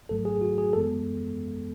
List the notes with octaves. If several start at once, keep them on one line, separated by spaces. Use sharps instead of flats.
G#1 G#2 F#3 A3 A4
G#4
F#4
G#4
F#2 E3 G#3 B3 A4